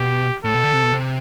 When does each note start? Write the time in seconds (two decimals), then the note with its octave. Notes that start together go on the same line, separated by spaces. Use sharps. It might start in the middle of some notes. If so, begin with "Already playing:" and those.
Already playing: B2 G4
0.44 A2 A4
0.54 B2
0.64 D3
0.73 C3
0.83 B2
0.93 C3